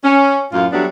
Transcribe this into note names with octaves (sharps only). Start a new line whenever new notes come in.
C#4
F#2 A2 F4
F#3 G3 A3 B3 D4